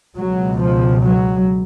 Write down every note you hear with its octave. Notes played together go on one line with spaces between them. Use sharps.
C#2 B2 F#3
F3
F#3